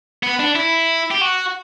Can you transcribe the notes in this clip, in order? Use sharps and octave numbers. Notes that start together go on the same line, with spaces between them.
B3
D4
E4
G4
F#4